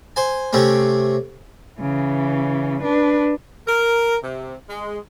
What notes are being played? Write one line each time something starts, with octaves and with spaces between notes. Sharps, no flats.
C5 G#5
C3 A3 C4 C#4
C#3 E3
D4 B4
A#4
C3
G#3